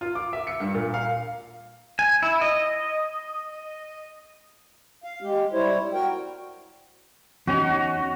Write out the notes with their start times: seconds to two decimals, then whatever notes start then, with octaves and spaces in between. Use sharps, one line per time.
0.01 F4
0.15 D6
0.33 E5
0.47 C#7
0.60 G2
0.74 A#2
0.94 F5
1.99 G#5
2.23 E4
2.41 D#5
5.04 F5
5.22 G#3 G4
5.53 G3 E4 C5 C#5
5.93 F#4 A#4 G5
7.47 E2 C#4 D#4 F#4